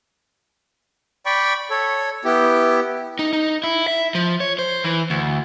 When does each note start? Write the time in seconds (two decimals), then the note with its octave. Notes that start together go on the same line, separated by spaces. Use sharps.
1.26 D5 G5 B5 C#6
1.70 A4 C#5
2.25 B3 E4 G4
3.19 D#4
3.33 D#4
3.64 E4
3.88 E5
4.15 F3
4.40 C#5
4.59 C5
4.84 E3
5.10 D2